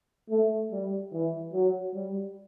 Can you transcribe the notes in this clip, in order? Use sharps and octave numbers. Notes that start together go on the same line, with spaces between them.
A3
G3
E3
F#3
G3